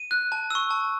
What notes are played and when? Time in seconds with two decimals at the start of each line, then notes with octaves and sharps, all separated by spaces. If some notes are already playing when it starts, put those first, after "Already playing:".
Already playing: D#7
0.11 F#6
0.32 A5
0.50 C#6 E6
0.71 A5